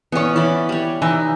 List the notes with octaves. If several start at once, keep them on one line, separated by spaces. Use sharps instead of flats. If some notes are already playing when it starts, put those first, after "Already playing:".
E3 B3 C#4 C#5
E3 D5 B5
G3 C#5
E3 D#4